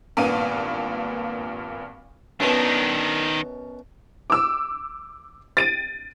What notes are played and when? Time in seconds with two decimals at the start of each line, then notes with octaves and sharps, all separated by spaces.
0.17 G#1 G2 A#2 B3 F5 D#7
2.40 F#2 B2 D#3 D4
4.30 D6 E6
5.57 A6 D7 D#7